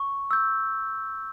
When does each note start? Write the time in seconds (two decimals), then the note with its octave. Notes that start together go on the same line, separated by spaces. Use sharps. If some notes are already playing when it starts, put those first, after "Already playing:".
Already playing: C#6
0.31 E6 G6